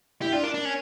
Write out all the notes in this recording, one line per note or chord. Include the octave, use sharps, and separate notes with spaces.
E4 G4
D4 F4
D4 A#4
D4
C#4